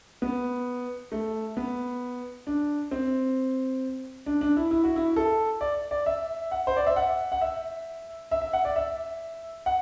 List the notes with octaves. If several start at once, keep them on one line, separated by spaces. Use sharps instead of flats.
B3
A3
B3
D4
C4
D4
D4
E4
E4
F#4
E4
A4
D5
D5
E5
F#5
C5
D5
E5
F#5
F#5
E5
E5
E5
F#5
D5
E5
F#5